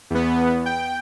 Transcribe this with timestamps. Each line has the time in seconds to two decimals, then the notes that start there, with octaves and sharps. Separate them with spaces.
0.10 E2 B3
0.66 G5